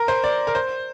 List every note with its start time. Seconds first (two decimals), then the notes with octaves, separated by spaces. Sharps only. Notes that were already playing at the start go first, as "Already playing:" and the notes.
Already playing: A#4
0.08 C5
0.24 D5
0.47 A#4
0.55 C5